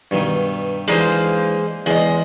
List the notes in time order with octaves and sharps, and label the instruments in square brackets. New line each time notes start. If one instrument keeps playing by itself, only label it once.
[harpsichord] G2 B2 D#3
[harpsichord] E3 D4 D#4 [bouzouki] G#3 A#3 C5
[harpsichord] E2 [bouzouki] G#3 D#5